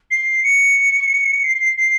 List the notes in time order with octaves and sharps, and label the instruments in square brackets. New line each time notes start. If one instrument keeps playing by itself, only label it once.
[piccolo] C7
C#7
C7
C7